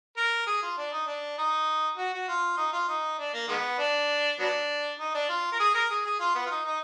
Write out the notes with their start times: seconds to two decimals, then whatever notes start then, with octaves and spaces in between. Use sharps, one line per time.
0.17 A#4
0.47 G#4
0.63 F4
0.78 D4
0.93 D#4
1.07 D4
1.38 D#4
1.98 F#4
2.13 F#4
2.28 F4
2.58 D#4
2.73 F4
2.89 D#4
3.19 D4
3.34 A#3
3.48 D#3 G#3 B3
3.79 D4
4.39 F#3 B3 D4
4.99 D#4
5.15 D4
5.29 F4
5.52 A#4
5.60 G#4
5.75 A#4
5.90 G#4
6.05 G#4
6.20 F4
6.35 B3
6.46 F4
6.51 D#4
6.66 D#4